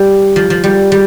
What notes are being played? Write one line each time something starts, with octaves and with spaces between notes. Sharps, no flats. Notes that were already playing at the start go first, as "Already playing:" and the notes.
Already playing: G3
F3
F3
G3
G3